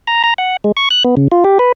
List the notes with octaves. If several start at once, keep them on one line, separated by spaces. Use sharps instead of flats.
A#5
A#5
F#5
G#3
C#6
F#6
B3
C#3
F4
G4
B4